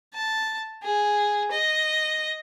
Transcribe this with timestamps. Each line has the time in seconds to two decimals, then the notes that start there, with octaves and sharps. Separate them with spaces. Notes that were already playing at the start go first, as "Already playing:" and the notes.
0.14 A5
0.83 G#4
1.51 D#5